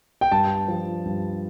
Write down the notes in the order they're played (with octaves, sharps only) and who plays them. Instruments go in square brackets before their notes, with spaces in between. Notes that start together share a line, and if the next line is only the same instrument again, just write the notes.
[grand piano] G5
G2 A5
F3
G2